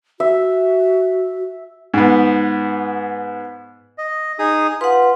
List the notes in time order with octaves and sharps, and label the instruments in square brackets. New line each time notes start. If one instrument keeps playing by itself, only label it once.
[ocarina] F#4 [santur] E5
[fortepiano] G#2 B3
[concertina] D#5
D#4 G#4 D#6
[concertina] F4 [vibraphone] B4 F#5